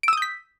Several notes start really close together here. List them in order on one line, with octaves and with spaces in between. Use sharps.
D7 E6 D#6 G6 B6